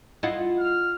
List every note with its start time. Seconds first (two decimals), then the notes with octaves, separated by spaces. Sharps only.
0.23 E4 F4 D#5 F#5
0.59 F6